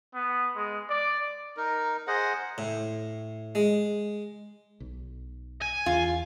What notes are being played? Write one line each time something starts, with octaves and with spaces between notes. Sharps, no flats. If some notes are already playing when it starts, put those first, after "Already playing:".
B3
G#3
D5
D#4 A#4
G#4 C5 D#5 F#5
A2
G#3
B1
G#5
E2 F4